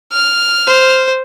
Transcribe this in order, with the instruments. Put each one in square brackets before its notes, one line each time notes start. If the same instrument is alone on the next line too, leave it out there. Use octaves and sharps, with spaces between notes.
[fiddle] F6
[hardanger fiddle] C5